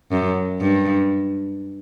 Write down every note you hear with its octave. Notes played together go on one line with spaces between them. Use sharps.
F#2
G2